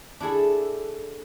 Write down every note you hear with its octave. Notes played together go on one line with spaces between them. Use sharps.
D4 E4 G#4 A4